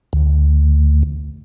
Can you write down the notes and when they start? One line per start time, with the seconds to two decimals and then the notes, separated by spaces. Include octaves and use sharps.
0.13 D2